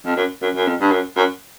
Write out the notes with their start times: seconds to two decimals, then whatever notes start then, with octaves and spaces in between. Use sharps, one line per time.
0.05 F2
0.16 F#2
0.42 F#2
0.56 F#2
0.67 F2
0.81 G2
0.92 F#2
1.16 F#2